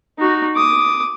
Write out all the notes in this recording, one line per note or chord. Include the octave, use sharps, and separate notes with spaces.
D#4 F#4
D6 D#6